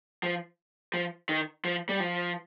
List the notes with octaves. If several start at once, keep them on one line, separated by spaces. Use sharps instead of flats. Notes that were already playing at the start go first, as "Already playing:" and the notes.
F3
F3
D#3
F3
G3
F3